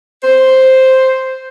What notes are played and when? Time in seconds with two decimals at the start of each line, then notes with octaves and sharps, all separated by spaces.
0.23 C5